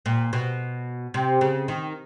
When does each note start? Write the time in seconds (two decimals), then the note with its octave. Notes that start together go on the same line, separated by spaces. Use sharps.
0.06 A#2
0.33 B2
1.14 C3
1.41 C#3
1.68 D#3